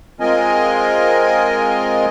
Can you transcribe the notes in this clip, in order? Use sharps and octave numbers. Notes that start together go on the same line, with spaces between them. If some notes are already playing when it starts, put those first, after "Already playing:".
G#3 C4 F4 A#4 D#5 G#5